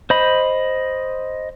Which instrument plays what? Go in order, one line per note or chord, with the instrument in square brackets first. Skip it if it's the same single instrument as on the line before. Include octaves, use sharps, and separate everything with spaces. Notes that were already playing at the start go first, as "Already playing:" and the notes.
[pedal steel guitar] C5 D#5 B5